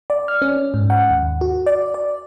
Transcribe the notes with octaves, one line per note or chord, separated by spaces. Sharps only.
D5
F6
C#4
G#2
F#5
D#2
F#4
D5
D5